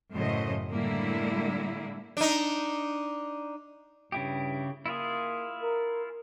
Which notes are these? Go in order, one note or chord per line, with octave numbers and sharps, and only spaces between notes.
F#2 A2 C#3 C5 D#5
A2 D3 G3 G#3 A#3 E4
D4 D#4
G2 C#3 E4 G4
A#3 E4 F4 G#4
A#4